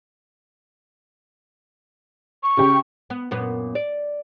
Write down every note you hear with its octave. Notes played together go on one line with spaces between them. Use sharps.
C#6
C#3 G4
B3
F#2 A#2 B3
D5